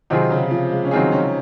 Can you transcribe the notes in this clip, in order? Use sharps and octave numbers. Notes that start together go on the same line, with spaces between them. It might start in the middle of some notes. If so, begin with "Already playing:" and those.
C3 D#3 F#3 C4 F4 G#4
C#3
F3
G#3
C#4
D#3 F#3 C4 D#4 F4 G#4
C#4